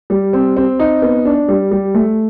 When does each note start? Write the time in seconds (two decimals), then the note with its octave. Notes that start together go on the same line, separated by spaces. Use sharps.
0.10 G3
0.33 C4
0.57 C4
0.80 D#4
1.02 B3
1.25 D4
1.48 G3
1.71 G3
1.94 A3